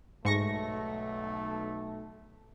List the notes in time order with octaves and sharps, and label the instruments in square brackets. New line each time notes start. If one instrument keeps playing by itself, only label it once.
[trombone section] B1 A3 [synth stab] G#2 C#6 A#6